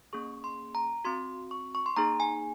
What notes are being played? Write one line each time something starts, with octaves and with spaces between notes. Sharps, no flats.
A#3 C#4 G#4 C#6
C6
A#5
C4 F#4 C6
C#6
C#6
C6
A#3 D#4 G#4 A#5
G#5